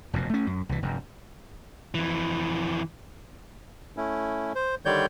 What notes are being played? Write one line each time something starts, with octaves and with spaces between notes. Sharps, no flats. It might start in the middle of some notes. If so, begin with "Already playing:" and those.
F1 F#2 B2
A3 C#4
F#2
C2 E3
F1 G2
F2 E3
A3 C#4 E4
C5
D3 D#3 G3 C#5 D5 G6